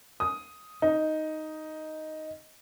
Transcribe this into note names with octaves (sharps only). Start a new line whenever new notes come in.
D#6
D#4